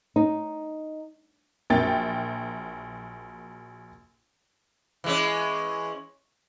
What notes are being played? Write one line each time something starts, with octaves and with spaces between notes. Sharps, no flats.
D#4
A#1 F#3 A#3 G5 A6
E3 G#3 C#4